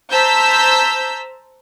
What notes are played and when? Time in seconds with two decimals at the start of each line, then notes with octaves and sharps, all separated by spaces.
0.11 C5 A5 A#5 E6 G6 B6